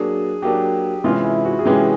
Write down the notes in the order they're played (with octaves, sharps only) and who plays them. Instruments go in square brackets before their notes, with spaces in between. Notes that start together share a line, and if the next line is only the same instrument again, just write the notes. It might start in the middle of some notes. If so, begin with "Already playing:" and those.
Already playing: [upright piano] F#3 A#3 D4 [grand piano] G#4
[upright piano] F#3 A#3 D4 [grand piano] G4
[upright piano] C3 E3 G#3 C#4 [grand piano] F4
[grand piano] E4
F#4
G#4
[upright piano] C3 E3 G#3 C#4 [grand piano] G4